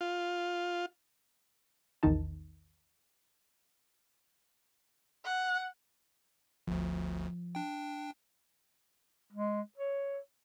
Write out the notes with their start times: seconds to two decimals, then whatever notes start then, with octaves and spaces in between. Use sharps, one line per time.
0.01 F4
2.03 A#1 E2 D#3 D#4 A5
5.24 F#5
6.67 G1 D2 F3
7.55 D4 G5
9.32 G#3
9.77 C#5